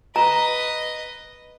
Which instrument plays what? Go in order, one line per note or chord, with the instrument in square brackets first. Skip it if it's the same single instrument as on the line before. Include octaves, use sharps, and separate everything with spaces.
[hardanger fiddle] B4 D#5 [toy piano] A#5